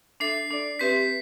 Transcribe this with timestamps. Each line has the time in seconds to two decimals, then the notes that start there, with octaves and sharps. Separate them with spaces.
0.20 D4 A4 E5 C7
0.51 D4 A4 D5
0.79 C4 G4 B4 E5 B6